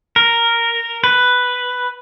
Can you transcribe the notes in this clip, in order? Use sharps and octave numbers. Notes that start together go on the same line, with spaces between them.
A#4
B4